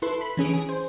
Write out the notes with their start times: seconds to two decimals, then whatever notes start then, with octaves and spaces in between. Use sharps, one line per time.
0.02 E4 A4 B4 C6
0.21 B5
0.37 E3 C#4 G#4 D7
0.53 G#4
0.69 C5